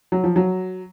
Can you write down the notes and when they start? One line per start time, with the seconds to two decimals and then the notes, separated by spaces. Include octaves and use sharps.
0.12 F#3
0.24 F3
0.36 F#3